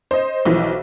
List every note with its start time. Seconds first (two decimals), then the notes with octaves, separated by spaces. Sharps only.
0.11 C5 D#5
0.45 B1 E3 F3